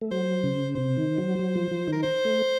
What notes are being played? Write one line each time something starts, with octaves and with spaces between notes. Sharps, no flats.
A3
F#3 C5
C#3
C3 C5
D#3
F#3
F#3
F3
F3
D#3
A#4
C5
A3